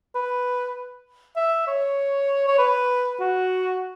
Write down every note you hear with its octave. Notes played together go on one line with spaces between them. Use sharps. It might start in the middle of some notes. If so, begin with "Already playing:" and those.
B4
E5
C#5
C#5
B4
F#4